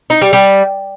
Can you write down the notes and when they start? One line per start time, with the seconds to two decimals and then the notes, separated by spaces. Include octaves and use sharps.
0.10 D#4
0.21 G3
0.33 G3